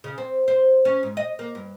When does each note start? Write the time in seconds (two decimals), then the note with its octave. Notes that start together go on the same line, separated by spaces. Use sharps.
0.04 C#3
0.18 C4
0.48 C5
0.85 C#4
1.03 G#2
1.17 D#5
1.39 A#3
1.55 G2